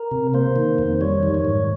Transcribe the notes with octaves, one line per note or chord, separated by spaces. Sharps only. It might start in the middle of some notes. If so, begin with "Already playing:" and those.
Already playing: A#4
C3
A#3 C5
D#3
F2
G3 C#5
D#3
C#5
G#2